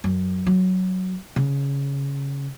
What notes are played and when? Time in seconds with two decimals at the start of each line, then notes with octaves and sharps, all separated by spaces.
0.04 F#2
0.46 F#3
1.36 C#3